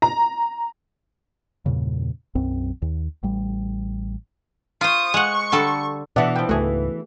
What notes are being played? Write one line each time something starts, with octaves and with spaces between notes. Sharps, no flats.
A#5
E2 G2 A#2 C#3
B1 F#2 C4
D#2
A1 G3
F4 C5 C#6 D#6
G#3 F#5 C#6
D3 G3 A4
B2 E3 B3 D4 D5 E5 F#5
F3 B4 G5
C#2 G#2 A3 F#4 G#4